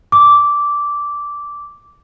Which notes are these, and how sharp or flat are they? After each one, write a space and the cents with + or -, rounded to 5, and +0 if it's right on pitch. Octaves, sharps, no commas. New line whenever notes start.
D6 -10